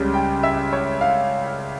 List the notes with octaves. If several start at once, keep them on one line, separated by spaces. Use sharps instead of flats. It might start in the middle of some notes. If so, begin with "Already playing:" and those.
Already playing: C#2 C#3 G3
G5
E5
C#5
F5